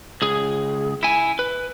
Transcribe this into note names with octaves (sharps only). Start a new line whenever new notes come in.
C#2 G#4
E4 G#5
B4